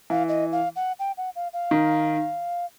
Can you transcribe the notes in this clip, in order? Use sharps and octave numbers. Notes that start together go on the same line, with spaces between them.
E3 F5
D#5
F5
F#5
G5
F#5
F5
F5
D#3